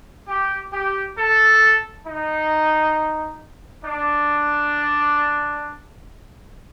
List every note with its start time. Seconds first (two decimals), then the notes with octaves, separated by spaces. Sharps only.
0.28 G4
0.72 G4
1.17 A4
2.06 D#4
3.84 D4